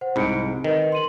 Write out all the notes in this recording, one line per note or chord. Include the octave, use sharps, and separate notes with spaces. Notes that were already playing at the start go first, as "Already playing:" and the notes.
C5 F#5
C2 G#2 B5 C#7 D7
D#3 A#4 B4 D#5
C6 D#7 F#7